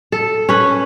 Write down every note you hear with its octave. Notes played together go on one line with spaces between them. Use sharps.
A4
C#4 B4